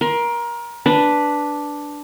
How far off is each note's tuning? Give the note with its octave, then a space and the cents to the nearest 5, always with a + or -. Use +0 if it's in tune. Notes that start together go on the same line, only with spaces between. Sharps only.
A#4 +25 C6 -10
D4 +0 B4 +0